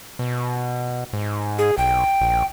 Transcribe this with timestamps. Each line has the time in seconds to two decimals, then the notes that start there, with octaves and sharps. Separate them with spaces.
0.19 B2
1.13 G#2
1.58 G#4
1.78 B1 G5
2.21 A#1